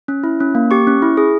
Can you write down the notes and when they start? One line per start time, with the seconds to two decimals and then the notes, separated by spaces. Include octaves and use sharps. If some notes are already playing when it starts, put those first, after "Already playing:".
0.08 C#4
0.24 E4
0.40 C#4
0.55 A#3
0.71 G4 C#6
0.87 C#4
1.02 E4
1.17 G#4